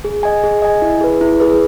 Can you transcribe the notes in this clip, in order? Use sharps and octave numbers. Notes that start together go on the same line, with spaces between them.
G#4
D#5 G#5
G#4
D#5 G#5
E4
G#4 B4
E4
G#4 B4